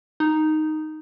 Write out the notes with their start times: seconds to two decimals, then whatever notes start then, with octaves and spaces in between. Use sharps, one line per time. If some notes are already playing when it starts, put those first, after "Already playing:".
0.20 D#4